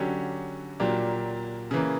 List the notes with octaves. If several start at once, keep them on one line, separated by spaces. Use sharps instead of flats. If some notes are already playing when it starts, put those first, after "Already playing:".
Already playing: D3 F#3 C#4 G4
A#2 F#3 A#3 D4 G4
C#3 E3 A#3